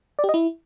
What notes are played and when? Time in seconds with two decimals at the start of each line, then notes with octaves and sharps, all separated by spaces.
0.19 D5
0.24 G4
0.29 D#5
0.34 E4